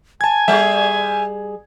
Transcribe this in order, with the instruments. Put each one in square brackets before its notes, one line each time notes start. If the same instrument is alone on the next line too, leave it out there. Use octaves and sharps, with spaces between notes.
[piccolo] G#5 [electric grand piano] A5 G#6
[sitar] G3 G#4 [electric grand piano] E5